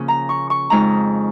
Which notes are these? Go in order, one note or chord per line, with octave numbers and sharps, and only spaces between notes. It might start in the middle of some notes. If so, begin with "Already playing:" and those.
Already playing: C#3 F3 A#3 C#4
A#5
C#6
C#6
F2 C#3 G#3 D#4 A#5